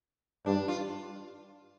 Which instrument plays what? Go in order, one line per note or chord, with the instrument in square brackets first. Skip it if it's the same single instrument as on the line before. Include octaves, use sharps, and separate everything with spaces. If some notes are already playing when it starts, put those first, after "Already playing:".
[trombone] G2 [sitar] D4
[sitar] F4